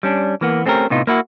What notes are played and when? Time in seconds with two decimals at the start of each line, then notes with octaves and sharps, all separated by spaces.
0.03 G3 C#4 D4
0.41 E3 A#3 B3
0.66 A3 C4 C#4 G4 A#4
0.90 A2 C3 B3 D#4 F4
1.07 A#3 E4 F#4